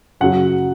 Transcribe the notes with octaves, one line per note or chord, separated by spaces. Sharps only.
F#2 C#3 F#3 F#5